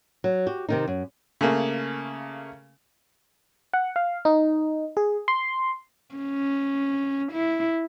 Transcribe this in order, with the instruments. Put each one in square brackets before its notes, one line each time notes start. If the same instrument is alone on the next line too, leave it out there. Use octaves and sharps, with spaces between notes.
[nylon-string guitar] F#3
F#4 G4
C3 D#3 D#4
F#2
[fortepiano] C#3 A3 A#3
[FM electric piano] F#5
F5
D#4
G#4
C6
[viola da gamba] C#4
E4